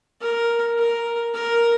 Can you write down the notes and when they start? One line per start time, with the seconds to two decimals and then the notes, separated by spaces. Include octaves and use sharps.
0.21 A#4
0.78 A#4
1.34 A#4